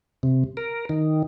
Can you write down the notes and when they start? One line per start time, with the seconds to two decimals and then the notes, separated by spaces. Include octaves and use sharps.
0.23 C3
0.57 A#4
0.89 D#3